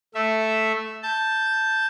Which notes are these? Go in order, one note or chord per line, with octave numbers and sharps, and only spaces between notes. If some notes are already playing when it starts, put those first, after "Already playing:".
A3 E5
A5 G6